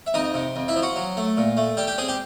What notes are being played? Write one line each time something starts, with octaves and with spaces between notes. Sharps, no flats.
E5
F2 D#4 D#5
C3
F2
E4 E5
F3
F#4 F#5
F#3
A3
A#2
A3
G3 G4 G5
G4 G5
C4 G#4 G#5
G4 G5